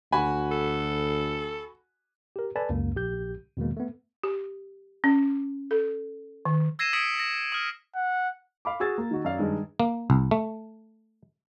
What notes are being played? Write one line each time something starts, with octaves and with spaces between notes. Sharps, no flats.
D2 F#4 G#5 B5
A4
G4 A#4
A4 B4 D5 G#5 A5 B5
C#2 F#2 A#3
A#1 G4 G6
E2 B2 D#3 G#3 A#3
A3 B3
G4
C#4
A4
D#3
E6 G#6 A#6 C7 D#7 E7
D#6 G#6 B6 C#7 D7
A#6
D#6 F6
F#5
F5 B5 D6
F#4 G#4 E6 G#6 A6
A#3
D#3 F#4
F#2 D5 F5
G2 D#3 G#3
A#3
C2
A3